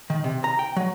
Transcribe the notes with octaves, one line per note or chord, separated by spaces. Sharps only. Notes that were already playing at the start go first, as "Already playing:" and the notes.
D#3
C3
A#5
G5
F#3